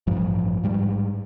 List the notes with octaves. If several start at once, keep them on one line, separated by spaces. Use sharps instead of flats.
A1 G2 F3
G#2 G3